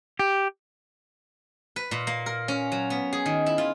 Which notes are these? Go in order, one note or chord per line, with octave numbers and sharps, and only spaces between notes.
G4
B4
A#2
A#3
A#4
C#4
F#3
B3
G#4
D#3
E4
F4